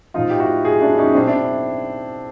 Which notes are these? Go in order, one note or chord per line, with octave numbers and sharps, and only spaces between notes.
A2 F3 D#4 F4
G4
E4 F#4
F#4 G#4
D4 E4
C#4 D#4
B2 C4 D4
D4 E4